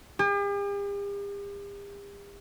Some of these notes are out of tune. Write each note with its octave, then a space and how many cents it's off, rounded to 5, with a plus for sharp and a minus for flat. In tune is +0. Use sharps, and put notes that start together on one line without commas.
G4 +45